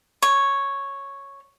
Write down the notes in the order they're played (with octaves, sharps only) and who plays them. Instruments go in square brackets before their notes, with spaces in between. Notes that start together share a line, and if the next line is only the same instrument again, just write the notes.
[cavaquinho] C#5